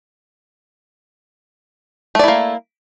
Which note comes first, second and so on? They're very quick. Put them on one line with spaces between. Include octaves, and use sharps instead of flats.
A3 D5 E4 A#3